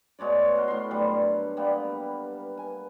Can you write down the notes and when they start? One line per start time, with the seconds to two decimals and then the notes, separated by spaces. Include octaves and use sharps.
0.19 B2 G#3 C#5 D5
0.55 F#4 A#4 C6
0.68 A2 C6
0.91 G2 F#3 G3
1.57 G3 A#3 B3
2.57 G#5